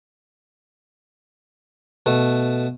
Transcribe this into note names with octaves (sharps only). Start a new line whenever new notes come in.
B2 A3